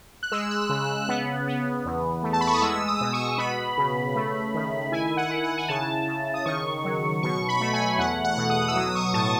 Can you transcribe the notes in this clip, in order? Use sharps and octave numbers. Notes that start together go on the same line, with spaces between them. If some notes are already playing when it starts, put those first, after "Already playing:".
F#6
G#3 E6
F#6
C#3 F#6
F#6
B3
B3
E2
A3
A5
B5
C#6
D#6
G#3 E6
D#6
B2
C#6
B3 B5
C#3
A3
D#3
E4 G#5
F#5
E4
F#5
G#5
C#3 A5
C#3
D#6
D#3 C#6
F#3
B2 C#6
B5
A3
G#5
E2 F#5
F#5
B2
D#6
E6
F#3 D#6
C#6
A2 A5